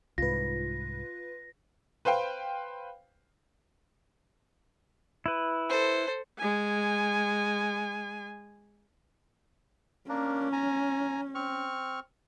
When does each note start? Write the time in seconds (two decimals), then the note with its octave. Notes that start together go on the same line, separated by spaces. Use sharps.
0.18 C2 G#2 F4 B4 A#6
2.05 B4 C5 F5 G5
5.26 E4 B4
5.69 A4 C5
6.38 G#3 G#5
10.09 A#3 C#4 D4 A#4
10.52 G#5 A#5
11.35 C4 C#6 F6